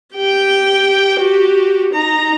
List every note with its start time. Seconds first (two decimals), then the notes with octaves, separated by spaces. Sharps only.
0.14 G4 G5
1.19 F#4 G4
1.93 D#4 A#5